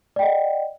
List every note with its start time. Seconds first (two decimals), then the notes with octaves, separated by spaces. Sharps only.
0.16 D5
0.19 G5
0.22 D#5
0.25 F#5